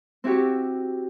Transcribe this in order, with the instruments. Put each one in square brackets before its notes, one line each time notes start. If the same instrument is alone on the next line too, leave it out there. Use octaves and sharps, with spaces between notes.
[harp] C4 E4 F#4 G4 C#6